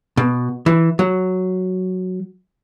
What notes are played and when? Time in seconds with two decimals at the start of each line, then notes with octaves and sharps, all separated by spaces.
0.17 B2
0.66 E3
0.99 F#3